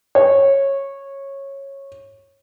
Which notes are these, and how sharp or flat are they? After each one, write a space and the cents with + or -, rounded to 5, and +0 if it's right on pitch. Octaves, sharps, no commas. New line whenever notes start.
C#5 -15